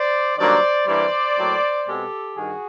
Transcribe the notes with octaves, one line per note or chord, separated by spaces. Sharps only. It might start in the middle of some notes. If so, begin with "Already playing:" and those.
Already playing: C5 D5
G2 D#3 F#3 A#3 C5 D5
G2 E3 G3 A#3 C5 D5
A2 F#3 A#3
B2 G#3 C4 G4 A4
G2 D#3 F#4 G#4